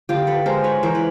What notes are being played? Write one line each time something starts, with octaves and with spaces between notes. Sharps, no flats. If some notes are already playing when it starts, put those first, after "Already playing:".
D3 F4 G4
A4 B4
G#3 A#4 C5
B4 C#5
E3 A#4 C5
B4